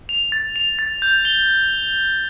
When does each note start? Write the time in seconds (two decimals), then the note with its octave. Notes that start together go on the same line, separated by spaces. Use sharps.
0.09 F7
0.32 A6
0.56 F7
0.79 A6
1.02 G6
1.25 G7